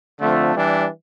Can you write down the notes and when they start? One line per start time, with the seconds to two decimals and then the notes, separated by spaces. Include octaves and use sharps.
0.19 D3 F3 A3 C4 F4
0.53 E3 G3 D4